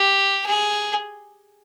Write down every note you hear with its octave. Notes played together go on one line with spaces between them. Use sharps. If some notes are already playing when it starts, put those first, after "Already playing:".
Already playing: G4
G#4